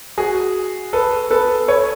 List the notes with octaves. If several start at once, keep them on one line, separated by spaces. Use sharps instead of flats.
F#4 G#4
A4 B4
A4 B4
B4 C#5